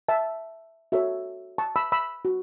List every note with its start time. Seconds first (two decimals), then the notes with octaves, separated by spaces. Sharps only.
0.09 E5 A5
0.92 F#4 A4 C#5 E5
1.58 A5 C#6
1.76 B5 E6
1.92 B5 E6
2.25 F#4